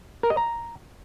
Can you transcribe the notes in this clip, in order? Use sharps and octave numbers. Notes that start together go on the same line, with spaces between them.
A#4
D#5
A#5